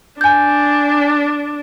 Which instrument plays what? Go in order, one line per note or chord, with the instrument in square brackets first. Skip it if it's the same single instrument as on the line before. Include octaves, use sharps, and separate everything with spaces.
[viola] D4 [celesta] G#5 G6